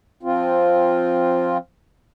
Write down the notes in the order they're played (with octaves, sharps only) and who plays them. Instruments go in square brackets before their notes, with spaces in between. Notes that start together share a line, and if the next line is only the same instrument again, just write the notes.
[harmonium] F3 C4 F4